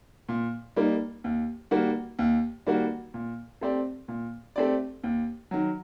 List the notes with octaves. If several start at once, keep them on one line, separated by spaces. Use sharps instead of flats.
A#2
G3 A#3 D#4
D#2
D#3 G3 A#3 F#4
D#2
D#3 G3 A#3 F#4
A#2
A3 C4 G4 D5
A#2
A3 C4 G4 D5
D#2
D#3 F#3